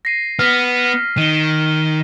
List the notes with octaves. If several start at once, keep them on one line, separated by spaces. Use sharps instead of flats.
A#6 C7 D#7
B3 F6 A#6 B6
D#3 D#7 G7